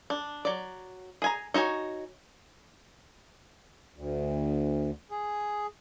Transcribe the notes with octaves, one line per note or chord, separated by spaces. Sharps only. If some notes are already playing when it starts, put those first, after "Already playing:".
D4
F#3 D5
G#4 G#5 A#5
D#4 F#4 C#5 G#5
D2
G#4